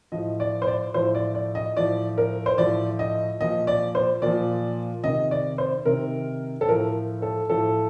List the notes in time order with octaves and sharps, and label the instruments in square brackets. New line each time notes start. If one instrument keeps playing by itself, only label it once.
[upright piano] A2 F3 D#5
D5
C5
D5
A2 F3 C5
D5
D5
D#5
A2 F3 D5
A#4
C5
A2 F3 D5
D#5
A#2 F3 D#5
D5
C5
A#2 F3 D5
C3 D#3 D#5
D5
C5
C3 D#3 A#4
A4
A2 F3 A#4
A4
A2 F3 A4